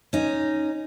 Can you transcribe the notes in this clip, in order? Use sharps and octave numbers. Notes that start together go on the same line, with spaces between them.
C#4 D#4